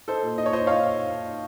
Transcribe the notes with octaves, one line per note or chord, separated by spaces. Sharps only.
D#4 A4 C5
A#2
D#4 D#5
C#5
A#2 C5 D#5
D#4 C#5 F5